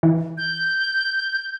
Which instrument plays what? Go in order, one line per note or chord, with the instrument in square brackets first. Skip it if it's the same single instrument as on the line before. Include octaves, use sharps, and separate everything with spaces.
[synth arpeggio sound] E3
[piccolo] G6